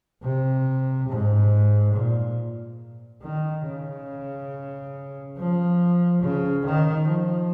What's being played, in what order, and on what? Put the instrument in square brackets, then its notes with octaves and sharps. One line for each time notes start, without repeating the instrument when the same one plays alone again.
[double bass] C3
G#2
A#2
D#3
C#3
F3
C#3
D#3
F3